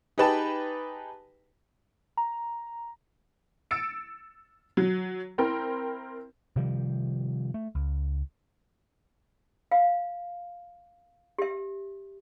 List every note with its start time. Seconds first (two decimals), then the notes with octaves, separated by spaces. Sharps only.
0.18 D#4 G4 G#4 B4 G5 A5
2.17 A#5
3.71 E6 A6 C#7 D7
4.77 F#3
5.38 C4 E4 A#4 G5
6.56 C3 D#3 F3 G3
7.54 A3
7.75 C#2
9.71 F5
11.38 G4 E5